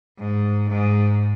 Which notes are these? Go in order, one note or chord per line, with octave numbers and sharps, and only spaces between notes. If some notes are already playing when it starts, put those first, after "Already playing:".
G#2
G#2